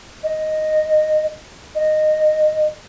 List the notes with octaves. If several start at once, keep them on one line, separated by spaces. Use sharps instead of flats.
D#5
D#5